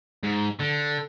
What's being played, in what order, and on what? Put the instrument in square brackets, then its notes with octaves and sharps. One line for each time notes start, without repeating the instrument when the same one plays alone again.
[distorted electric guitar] G#2
D3